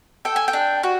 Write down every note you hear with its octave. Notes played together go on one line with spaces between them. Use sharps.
A4 G5
G#5
G5
D4
F#4